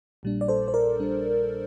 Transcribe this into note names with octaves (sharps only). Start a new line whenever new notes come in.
A#1 A#2 G3 D4
D5
A4 C5
C5
A#4 D5
A#1 A#2 G3 D4